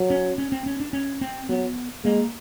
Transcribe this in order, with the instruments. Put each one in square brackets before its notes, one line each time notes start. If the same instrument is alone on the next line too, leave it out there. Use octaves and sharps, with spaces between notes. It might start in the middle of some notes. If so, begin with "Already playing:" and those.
Already playing: [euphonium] F#3
[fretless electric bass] C#4
C#4
C4
C#4
D4
C#4
C4
[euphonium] F#3 [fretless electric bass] B3
[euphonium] G#3 [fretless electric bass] A#3